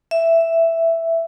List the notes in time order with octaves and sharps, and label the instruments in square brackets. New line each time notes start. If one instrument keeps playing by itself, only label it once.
[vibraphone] E5